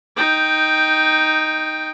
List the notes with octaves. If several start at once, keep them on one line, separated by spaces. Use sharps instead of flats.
D#4 G5